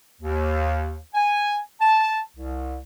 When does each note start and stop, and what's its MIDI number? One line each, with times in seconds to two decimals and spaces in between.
0.21 0.97 39
1.14 1.58 80
1.81 2.20 81
2.37 2.78 36